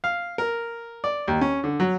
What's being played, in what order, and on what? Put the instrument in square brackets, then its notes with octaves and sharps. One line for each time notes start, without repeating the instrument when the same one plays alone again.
[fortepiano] F5
A#4
D5
D#2
C#4
D3
F#3